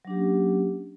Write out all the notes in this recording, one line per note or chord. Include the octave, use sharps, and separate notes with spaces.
F#3 A#3 C#4 D4 G4